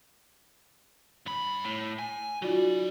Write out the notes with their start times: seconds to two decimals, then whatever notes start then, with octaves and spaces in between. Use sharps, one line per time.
1.26 G2 B5
1.64 A2
1.99 G#5
2.42 F#3 D#4 F4 F#4 D5